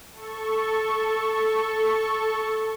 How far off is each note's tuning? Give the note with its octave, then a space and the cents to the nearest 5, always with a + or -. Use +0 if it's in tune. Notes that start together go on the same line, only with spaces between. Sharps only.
A4 +0 C#6 -5